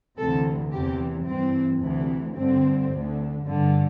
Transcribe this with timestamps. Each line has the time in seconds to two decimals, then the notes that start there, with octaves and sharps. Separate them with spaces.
0.17 D2 C3 E3 A4
0.72 E2 C3 E3 G4
1.26 G2 E3 C4
1.81 D2 C3 E3
2.36 G2 D3 C4
2.91 D2 D3
3.46 G2 D3